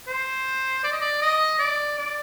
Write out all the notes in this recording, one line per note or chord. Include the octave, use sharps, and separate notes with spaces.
C5
D5
D#5
D5
D#5
D5
D5